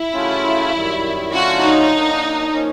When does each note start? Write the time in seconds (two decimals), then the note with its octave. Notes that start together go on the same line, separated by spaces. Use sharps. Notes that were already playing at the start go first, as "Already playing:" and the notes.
Already playing: E4
0.13 C#3 F#3 A3 C#4 F4
0.73 F#2 D#3 G3
1.32 D3 F#3 A3 C#4 F4 F#4
1.62 D#4
1.91 F#3 A#3 D4
2.52 F3 A#3 C#4